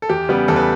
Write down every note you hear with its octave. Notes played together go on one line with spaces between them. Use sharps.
A4
E2 G4
C#3 G3 B3
E2 A4
B4